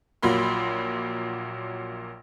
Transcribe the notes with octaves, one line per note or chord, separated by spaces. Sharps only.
A#1 A#2 F#3 A#3 B5 C6